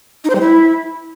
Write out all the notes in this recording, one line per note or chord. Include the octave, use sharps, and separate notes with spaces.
D#4
C5
G3
E4